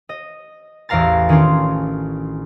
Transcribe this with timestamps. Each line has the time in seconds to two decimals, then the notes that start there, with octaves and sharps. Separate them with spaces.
0.09 D#5
0.89 A1 E2 D5 F5 A#5 A6
1.29 D#3 C#4 D4 F4